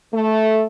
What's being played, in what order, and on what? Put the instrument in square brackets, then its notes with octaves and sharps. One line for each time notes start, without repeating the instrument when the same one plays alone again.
[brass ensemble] A3